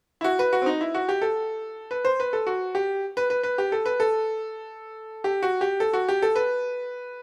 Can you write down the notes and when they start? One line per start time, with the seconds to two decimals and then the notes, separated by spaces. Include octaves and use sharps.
0.21 E4
0.24 F#4
0.39 B4
0.53 F#4
0.62 C4
0.66 D#4
0.81 E4
0.94 F#4
1.09 G4
1.22 A4
1.91 B4
2.05 C5
2.20 B4
2.33 A4
2.47 F#4
2.75 G4
3.17 B4
3.30 B4
3.43 B4
3.58 G4
3.72 A4
3.86 B4
4.00 A4
5.24 G4
5.42 F#4
5.61 G4
5.80 A4
5.93 F#4
6.08 G4
6.22 A4
6.36 B4